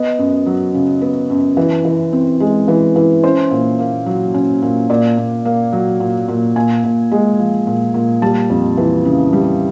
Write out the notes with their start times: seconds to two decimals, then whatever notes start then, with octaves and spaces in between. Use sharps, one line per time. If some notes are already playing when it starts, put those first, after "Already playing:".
Already playing: B3 D#5
0.19 F#2
0.46 F#3
0.74 C#3
1.01 B3
1.30 F#2
1.57 E3
1.85 E3
2.13 C4
2.40 G#3
2.68 E3
2.96 E3
3.23 C#4 C5
3.51 A#2
3.79 A#3
4.06 F#3
4.34 C#4
4.62 A#2
4.90 A#2 D5
5.17 A#2
5.45 A#3
5.73 F#3
6.00 A#2
6.28 A#2
6.56 A#2 G#5
6.84 A#2
7.11 G#3
7.39 F3
7.67 A#2
7.94 A#2
8.22 G3 A5
8.50 F2
8.77 E3
9.05 C#3
9.33 G3